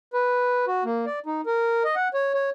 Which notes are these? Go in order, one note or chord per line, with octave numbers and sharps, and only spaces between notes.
B4
F#4
A#3
D5
D#4
A#4
D#5
F#5
C#5
C#5